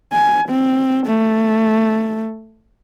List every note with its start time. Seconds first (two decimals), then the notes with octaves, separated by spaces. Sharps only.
0.13 G#5
0.49 C4
1.07 A3